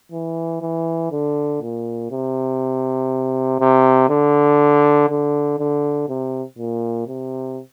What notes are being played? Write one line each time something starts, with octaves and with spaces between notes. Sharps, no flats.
E3
E3
D3
A#2
C3
C3
D3
D3
D3
C3
A#2
C3